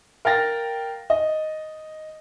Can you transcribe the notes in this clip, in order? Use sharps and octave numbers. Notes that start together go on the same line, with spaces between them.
A#4 F5 G5 A6 A#6
D#5